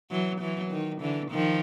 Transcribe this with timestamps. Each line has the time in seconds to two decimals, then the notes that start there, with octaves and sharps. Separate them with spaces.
0.11 E3 F#3
0.40 E3 F#3
0.71 D#3
1.01 D3 E3
1.31 D#3 F3